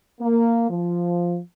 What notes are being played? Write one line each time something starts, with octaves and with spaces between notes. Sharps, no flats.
A#3
F3